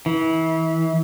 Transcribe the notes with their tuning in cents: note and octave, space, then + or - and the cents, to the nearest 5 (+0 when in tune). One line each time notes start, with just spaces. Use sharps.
E3 -30